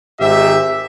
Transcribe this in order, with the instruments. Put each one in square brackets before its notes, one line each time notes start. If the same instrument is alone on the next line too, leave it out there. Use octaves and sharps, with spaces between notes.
[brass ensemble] G#1 G#2 G4 E5